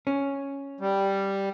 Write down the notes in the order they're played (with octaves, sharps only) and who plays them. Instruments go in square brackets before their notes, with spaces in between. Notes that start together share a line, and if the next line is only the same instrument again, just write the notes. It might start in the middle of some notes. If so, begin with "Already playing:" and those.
[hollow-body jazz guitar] C#4
[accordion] G3